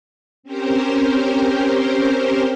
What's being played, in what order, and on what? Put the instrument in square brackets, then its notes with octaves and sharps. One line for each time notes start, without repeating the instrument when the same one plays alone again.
[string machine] C4 C#4 G4 A#4 C5